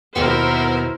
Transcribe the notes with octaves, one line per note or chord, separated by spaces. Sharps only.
D#2 B2 B3 E4 A#4 C5 G5